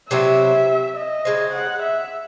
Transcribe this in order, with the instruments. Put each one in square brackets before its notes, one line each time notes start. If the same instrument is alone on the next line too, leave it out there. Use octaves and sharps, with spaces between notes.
[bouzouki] C3 F#3 C4 E4 [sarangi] E5
[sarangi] D#5
[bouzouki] C#3 G#3 C4
[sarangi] F#5
E5